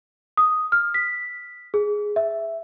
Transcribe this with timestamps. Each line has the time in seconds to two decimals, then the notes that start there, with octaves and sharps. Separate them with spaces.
0.37 D#6
0.72 F6
0.94 B6
1.74 G#4
2.16 E5